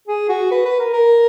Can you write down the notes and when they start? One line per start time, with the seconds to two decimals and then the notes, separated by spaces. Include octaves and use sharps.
0.08 G#4
0.29 F#4
0.51 B4
0.66 B4
0.80 A#4
0.93 A#4